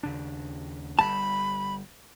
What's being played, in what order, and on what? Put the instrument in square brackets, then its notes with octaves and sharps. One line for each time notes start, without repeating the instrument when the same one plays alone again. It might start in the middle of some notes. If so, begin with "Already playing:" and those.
[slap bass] D#2 C#3 D4
[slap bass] G1 G3 [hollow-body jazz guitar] A5 [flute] B5